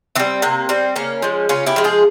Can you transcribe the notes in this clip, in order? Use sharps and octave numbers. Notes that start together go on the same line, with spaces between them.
E3 G3 C4
C3 A#3
G3 C4
C#3 A#3 C#4
F3 G#3
C#3 C#4 F4
E4 G4
F3 G#3
F4 G#4